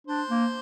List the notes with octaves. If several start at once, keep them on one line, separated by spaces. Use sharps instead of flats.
D4 C5
A#3